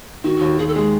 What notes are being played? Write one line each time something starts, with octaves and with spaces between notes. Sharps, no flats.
D#3 F#4
D#2
D#2 G#4
A4
G#3 G#4